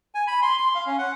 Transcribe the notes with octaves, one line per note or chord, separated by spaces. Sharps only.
G#5
B5
C6
C6
F5
C#4
F#5